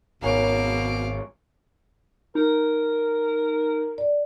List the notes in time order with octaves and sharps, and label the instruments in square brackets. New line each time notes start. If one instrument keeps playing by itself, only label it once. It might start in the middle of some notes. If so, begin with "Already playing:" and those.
[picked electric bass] G#1 [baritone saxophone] B2 [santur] A#3 C#4 [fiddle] F5 D6
[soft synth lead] D#4 [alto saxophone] A#4
[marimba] D5